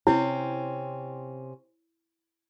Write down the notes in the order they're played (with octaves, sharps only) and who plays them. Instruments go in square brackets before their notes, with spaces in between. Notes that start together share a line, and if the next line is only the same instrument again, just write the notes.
[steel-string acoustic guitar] C3 C4 C#4 [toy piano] E4 C#5